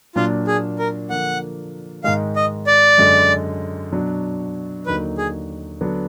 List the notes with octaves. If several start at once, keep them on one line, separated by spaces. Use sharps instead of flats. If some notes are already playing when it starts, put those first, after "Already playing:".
A#2 F#3 D4 F4
G#4
A#4
D3 F3 A#3 F#5
G#2 D#3 G#3 F5
D#5
D5
F#2 D3 G#3
B2 F#3 D4
D#2 D3 F#3 A#3 D#4 B4
G#4
D3 F#3 B3 D4